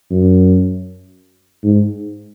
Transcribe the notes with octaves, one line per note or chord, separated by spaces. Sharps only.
F#2
G#2